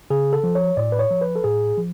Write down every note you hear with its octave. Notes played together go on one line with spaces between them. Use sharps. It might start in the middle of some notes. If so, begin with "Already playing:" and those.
C#3 G#4
A4
F3
C#5
A2 D5
B4
C#5
F3
B4
A4
A2 G#4
F3